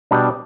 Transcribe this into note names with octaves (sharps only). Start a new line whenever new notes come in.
B2 G3 D4